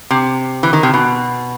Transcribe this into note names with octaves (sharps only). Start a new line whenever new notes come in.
C3
E3
D#3
C3
B2